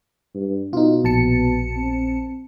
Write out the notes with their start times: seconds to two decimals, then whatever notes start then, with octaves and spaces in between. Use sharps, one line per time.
0.35 G2
0.73 B2 D#4 F4
1.04 A#1 A5 C#7
1.76 C4